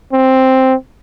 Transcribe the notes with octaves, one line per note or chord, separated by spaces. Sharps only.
C4